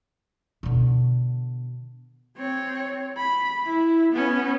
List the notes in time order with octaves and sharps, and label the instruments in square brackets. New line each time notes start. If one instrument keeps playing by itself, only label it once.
[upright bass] B2 D3
[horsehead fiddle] C4 C#5
B5
E4
B3 C#4